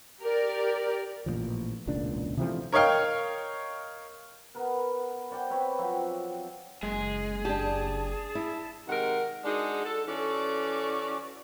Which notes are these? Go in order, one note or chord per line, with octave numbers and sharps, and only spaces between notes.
G4 A#4 D5
A1 A#2 D#3 F3
E1 C#2 A#2 D4
C3 E3 F3 A3
A#4 C#5 D#5 F5 G5
B3 A#4 B4
C5 D5 F#5 G5
C4 B4 C#5 B5
F3 F#3 C4
F#1 G#3 G#4
D4 G4 A5
E4
C3 D#3 G#3 A#4 F#5
G#3 D4 D#4 F#4 G#4
A4
E3 C#4 F#4 A4 D5